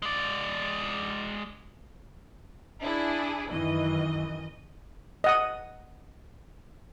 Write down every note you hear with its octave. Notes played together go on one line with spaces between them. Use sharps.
G#3 D5
D4 E4 G#4
F#2 D#3 E3 D#5
D#5 F#5 D#6